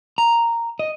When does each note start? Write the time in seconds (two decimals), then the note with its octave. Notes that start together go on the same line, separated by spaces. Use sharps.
0.18 A#5
0.79 D#5